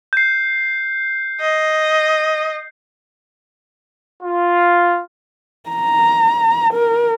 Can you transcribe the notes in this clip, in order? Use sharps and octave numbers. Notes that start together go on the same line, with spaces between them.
G6 C7
D#5
F4
A#5
A#4